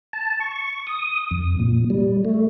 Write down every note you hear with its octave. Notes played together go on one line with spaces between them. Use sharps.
A5
C#6
D#6
F2
A#2
G3
A3